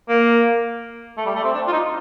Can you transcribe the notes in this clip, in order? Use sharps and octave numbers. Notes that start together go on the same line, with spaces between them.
A#3
A3
G3
A3
C4
D4
F4
D#4